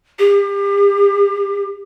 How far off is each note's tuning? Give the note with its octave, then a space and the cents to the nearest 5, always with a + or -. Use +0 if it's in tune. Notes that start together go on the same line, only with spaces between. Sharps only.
G4 +35